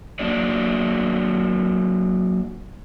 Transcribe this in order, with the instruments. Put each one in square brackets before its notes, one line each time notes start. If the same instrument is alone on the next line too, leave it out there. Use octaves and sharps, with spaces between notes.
[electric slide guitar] F#3 A#3 D4 D5